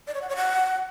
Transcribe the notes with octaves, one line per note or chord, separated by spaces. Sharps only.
D5
C#5
F#5
C#5
F#5